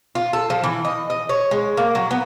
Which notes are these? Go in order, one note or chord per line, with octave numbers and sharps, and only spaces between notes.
F4
A4
F3
E3
D#5
D#5
C#5
G#3
A#3
F#3
B3